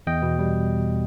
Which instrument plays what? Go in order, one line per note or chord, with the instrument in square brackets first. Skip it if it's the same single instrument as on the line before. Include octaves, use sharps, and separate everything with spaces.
[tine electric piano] E2 D#5 G5
B2
G3